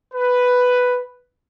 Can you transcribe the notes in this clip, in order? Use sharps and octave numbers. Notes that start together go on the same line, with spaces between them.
B4